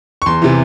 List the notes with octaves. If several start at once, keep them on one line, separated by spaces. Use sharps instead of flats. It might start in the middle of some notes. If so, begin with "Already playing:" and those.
C#6
E2 C6
C3 E3